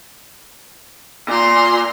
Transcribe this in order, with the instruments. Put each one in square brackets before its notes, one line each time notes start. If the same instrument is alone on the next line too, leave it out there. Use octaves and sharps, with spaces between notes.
[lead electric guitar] A#2 [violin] A#5 C6